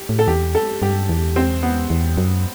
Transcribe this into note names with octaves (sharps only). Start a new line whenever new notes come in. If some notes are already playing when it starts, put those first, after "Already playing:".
Already playing: G4
A2
A4
E2 G4
A4
G2 G4
E2
C4
B3
E2
F#2